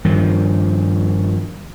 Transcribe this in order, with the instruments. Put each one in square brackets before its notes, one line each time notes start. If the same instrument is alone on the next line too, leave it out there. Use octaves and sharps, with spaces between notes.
[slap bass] G2 D#3 F3